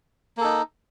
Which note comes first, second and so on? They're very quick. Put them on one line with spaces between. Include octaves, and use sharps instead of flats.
A#3 A4 D#4